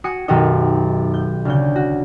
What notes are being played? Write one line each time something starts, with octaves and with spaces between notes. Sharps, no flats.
F#4 G#5 D#6 C#7
B1 F#2 D#3 F#4 G4 D#5
G6
D2 C#3 G6
F#4